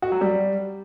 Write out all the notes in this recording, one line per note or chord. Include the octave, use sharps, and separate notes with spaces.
F#4
F#3
G3